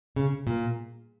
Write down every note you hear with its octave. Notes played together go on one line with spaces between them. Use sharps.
C#3
A#2